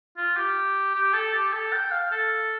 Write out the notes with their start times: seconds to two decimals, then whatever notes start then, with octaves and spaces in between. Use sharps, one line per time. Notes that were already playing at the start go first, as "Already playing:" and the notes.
0.17 F4
0.37 G4
0.95 G4
1.13 A4
1.34 G4
1.53 A4
1.73 G5
1.91 F5
2.11 A4